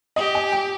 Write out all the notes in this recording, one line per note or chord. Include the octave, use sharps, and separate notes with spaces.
G4 D#5
G#5
G5